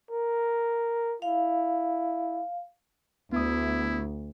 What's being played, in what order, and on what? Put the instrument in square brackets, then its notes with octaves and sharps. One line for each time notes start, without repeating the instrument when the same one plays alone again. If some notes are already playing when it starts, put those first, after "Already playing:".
[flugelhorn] A#4
[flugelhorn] E4 [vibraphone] F5
[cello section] D2 [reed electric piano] B3 D#6 [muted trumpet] E4